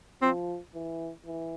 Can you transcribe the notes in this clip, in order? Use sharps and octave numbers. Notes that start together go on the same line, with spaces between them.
F3 C4
E3
E3